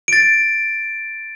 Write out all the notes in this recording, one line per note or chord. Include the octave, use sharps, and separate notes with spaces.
A6 D7